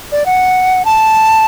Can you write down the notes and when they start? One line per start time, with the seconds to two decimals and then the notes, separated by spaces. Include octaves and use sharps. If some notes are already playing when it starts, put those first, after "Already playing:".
0.12 D5
0.26 F#5
0.85 A5